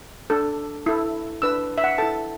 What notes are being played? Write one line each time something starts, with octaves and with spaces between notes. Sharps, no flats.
D4 A4
E4 A4
D4 B4 E6
E5
F#5
E4 A4 A5